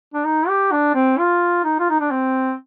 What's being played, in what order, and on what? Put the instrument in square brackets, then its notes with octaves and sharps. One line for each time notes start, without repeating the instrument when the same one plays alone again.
[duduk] D4
D#4
G4
D4
C4
F4
D#4
F4
D#4
D4
C4